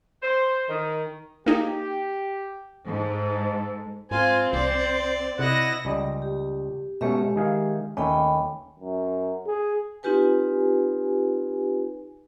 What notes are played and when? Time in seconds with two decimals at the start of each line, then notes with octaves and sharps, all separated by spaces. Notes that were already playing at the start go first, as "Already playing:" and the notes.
0.22 C5
0.69 D#3
1.46 A#3 D#4 G4 G#4
2.87 G#2 A4
4.11 G#2 C4 F4 G#5
4.53 C2 C5 D5
5.39 C3 E4 D#5 F#5 A#6
5.85 C#2 G3 D#5
6.22 G4
7.01 B2 G#3 A3 C#4 G4 E5
7.36 D#3 G#4 F5
7.97 D#2 A3 C#4 D#5 G5 B5
8.79 F#2
9.47 G#4
10.03 C4 D#4 F4 G4 B4 G#5